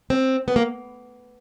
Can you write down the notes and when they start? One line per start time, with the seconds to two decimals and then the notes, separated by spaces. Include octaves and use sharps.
0.10 C4
0.48 B3
0.56 A#3